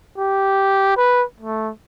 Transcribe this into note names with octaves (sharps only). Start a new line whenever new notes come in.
G4
B4
A3